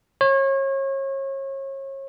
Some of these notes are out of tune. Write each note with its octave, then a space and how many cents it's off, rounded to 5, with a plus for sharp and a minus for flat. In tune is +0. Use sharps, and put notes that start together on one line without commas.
C#5 -35